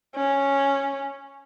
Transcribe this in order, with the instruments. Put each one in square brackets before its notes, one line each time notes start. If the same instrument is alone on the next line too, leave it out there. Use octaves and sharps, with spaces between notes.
[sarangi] C#4